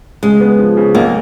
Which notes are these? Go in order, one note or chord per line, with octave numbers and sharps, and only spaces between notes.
C#3 G#3
B3
F3
C#3
B1 A#3